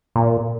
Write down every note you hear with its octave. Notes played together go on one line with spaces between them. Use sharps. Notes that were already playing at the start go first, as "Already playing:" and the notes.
A#2